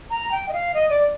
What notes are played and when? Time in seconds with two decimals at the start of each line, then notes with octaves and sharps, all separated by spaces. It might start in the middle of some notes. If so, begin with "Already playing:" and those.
0.10 A#5
0.32 G5
0.49 D#5
0.53 F5
0.74 D#5
0.90 D5